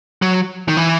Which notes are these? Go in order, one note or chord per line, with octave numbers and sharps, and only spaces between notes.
F#3
D#3
E3